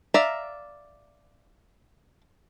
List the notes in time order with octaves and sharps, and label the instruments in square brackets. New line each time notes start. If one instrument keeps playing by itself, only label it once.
[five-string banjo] D5 E5 F5 A#5